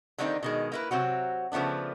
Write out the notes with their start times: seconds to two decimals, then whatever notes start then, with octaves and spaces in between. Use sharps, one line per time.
0.18 D3 D#3 G3 A#3 C4 D#4
0.43 B2 D#3 G#3
0.72 A#3 E4 B4
0.91 C3 F#3 C4 F#4
1.52 C#3 F3 A3 B3 D4